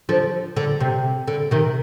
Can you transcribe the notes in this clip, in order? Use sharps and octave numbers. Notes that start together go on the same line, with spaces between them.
D3 F3
D3
C3
D3
C3 D#3